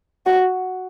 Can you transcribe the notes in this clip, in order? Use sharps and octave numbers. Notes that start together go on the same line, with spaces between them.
F#4